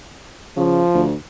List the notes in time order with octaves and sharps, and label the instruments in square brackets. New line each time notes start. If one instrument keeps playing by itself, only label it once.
[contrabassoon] C#3 [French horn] F3
[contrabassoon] D2